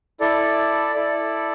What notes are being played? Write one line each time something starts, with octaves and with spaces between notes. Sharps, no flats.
E4 A4 D5
E4 A4 D5